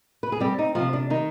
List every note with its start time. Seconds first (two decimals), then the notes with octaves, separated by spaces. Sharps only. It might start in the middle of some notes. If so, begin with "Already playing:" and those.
0.23 B4
0.32 G#4
0.40 G3 C4 G4
0.59 D#4
0.75 C3 F3 F4
0.93 D4
1.10 D#3 D#4